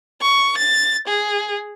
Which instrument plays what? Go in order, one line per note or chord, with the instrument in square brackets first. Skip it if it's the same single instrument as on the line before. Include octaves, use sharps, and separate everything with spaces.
[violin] C#6
A6
G#4